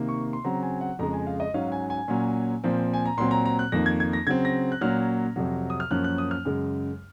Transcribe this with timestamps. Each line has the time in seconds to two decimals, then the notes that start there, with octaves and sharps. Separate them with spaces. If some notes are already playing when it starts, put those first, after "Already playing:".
Already playing: C3 D#3 A#3
0.08 C#6
0.33 C6
0.44 C#3 F#3 C4 A#5
0.63 G#5
0.81 F#5
0.99 F2 C#3 G#3 A#5
1.13 G#5
1.27 F5
1.40 D#5
1.54 G#2 F#3 C#4 F5
1.72 G#5
1.90 G#5
2.08 A#2 F#3 A#3 C#4
2.64 A#2 F3 C4
2.94 G#5
3.06 A#5
3.18 A#2 F#3 C4 C6
3.31 A#5
3.45 A#5
3.59 F#6
3.72 F2 D#3 A#3 A#6
3.86 G#6
4.00 G#6
4.13 A#6
4.27 C#3 F#3 C4 G#6
4.45 A#6
4.72 F#6
4.81 A#2 F#3 A#3 C#4 F6
5.36 F2 C3 F#3
5.70 D#6
5.80 F6
5.91 F#2 F3 A#3 C#4 F#6
6.04 F#6
6.18 D#6
6.31 F6
6.45 F#2 C#3 G#3